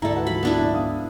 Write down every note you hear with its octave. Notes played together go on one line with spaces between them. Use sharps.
D2 G#2 E4 A4 D5 E5 A#5
F#4 B4 F#5
F#3 F4 B5
B3 D4 E4
A#1
B1 F5 D#6